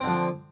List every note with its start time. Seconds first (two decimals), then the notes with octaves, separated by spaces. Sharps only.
0.01 C4
0.04 D3
0.07 F3